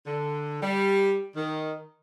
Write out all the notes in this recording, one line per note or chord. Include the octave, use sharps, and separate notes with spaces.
D3
G3
D#3